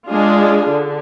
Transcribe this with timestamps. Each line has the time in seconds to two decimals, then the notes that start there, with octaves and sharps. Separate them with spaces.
0.08 G#3 D4 F4 G#4
0.70 D3